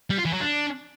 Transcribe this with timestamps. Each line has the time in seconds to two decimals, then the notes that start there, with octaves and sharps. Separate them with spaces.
0.10 G3
0.18 F4
0.26 E3
0.33 F#3
0.41 D4